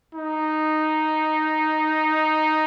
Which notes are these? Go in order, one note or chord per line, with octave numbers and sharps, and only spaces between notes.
D#4